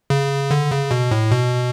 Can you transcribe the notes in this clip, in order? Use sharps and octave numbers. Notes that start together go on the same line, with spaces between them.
C#3
D3
C#3
B2
A2
B2